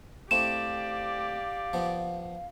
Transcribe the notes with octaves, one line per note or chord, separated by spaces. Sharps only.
A3 C4 E4 G4 D5 F5 E7
F3 B3